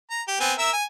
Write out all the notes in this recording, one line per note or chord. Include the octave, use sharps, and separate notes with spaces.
A#5
G4
B3 C4 G#5
A#4 E5 E6
G#5